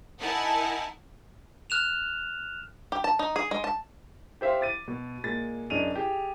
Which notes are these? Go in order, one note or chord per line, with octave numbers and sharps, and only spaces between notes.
D#4 E4 A#4 F#5 G#5 A5
F6 F#6 E7 F7
G4
A5
D#4
G#4
G#3
A5
G4 C5 E5 F5 C6
D6 A6 D#7
B2
A#2 G#3 A6
F#2 D4 G#4 D#5 D#7 F7
G4 G#4